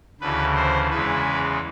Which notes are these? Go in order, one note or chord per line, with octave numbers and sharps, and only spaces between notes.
D2 C#3 E3 B4
C5
E2 C#3 E3 G#3 B4